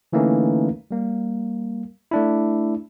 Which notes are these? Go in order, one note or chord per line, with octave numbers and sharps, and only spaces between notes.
D3 E3 A3 A#3 C#4 D#4
G3 A#3
A3 D4 E4